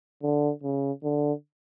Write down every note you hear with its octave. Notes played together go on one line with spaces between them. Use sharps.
D3
C#3
D3